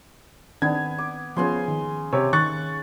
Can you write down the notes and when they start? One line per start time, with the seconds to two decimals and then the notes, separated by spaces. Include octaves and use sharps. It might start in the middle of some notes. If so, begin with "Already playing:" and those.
0.62 D#3 B3 C4 D4 G#6
0.98 D6
1.37 C#3 F3 B3 B4 G#5 C6
1.68 D#3
2.13 C3 C#5
2.33 D#3 C#6 F#6 A6